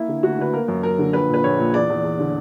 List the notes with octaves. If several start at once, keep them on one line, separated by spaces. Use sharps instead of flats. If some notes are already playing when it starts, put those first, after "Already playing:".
Already playing: A#3 E4
D3
D2 F#4
D3 B4
A#3 A#4
F#2
F#2 A#4
D3
A#1 B4
A#2
B4
A#1 C#5
A#2
E2 D5
E2
E2
D3